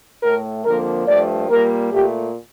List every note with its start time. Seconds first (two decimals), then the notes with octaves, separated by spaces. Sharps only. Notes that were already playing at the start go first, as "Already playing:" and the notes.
0.23 A2 A3 A#4
0.65 F2 D3 F3 A#3 A#4
1.08 G2 F3 A3 D5
1.50 A#2 G3 A#3 A#4
1.92 A#2 A3 G4